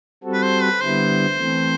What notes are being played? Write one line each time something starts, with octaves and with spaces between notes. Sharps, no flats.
G3 C4 F#4 A4
B4
C5
B4
D3 G3 B3 E4 C5
E3 A3 C4